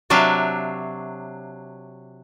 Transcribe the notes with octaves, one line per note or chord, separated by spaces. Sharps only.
C3 F#3 D4 E5 F5